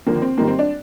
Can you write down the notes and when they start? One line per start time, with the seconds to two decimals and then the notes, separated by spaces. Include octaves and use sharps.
0.06 D#2 D3 F3 A#3
0.22 C4
0.38 G#2 D#3 G3 A#3
0.47 C4
0.59 D4